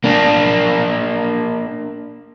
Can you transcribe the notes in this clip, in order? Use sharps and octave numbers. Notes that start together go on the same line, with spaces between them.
A#3 D4